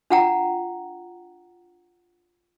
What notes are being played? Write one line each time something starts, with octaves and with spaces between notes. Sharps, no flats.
D4 F4 F#5 G5 A#5